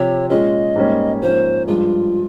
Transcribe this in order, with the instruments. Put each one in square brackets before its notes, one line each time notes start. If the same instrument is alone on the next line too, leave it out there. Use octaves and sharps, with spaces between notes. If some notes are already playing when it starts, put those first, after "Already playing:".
Already playing: [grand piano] C3 F3 C4 G4 [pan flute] C#5
[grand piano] A#2 G#3 C#4 F4 [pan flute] D#5
[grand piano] G#2 G3 A#3 C#4
[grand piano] G#2 F3 A#3 C#4 [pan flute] C5
[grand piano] G2 F3 G#3 [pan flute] F4